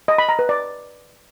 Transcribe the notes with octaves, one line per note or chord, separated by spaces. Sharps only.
D#5
B5
A#5
B4
D5